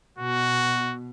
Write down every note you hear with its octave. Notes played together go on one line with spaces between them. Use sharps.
B2 F#4